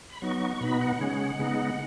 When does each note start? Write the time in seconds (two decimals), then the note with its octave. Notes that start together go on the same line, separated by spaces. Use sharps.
0.10 B5
0.22 F#3 B3 D#4 C#6
0.61 B2 B3 D#4 B5
0.81 F#5
1.00 C#3 G#3 C#4
1.39 C#3 G#3 B3 D#4